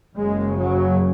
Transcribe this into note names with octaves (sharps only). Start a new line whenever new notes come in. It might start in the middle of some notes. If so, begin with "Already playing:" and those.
F#1 F#2 C#3 G#3
F#3